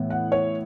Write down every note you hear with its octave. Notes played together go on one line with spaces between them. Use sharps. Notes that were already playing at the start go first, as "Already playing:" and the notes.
Already playing: A2 E3 B3 E4
F#5
C#5